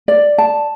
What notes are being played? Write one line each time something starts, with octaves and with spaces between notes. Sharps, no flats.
D5
A5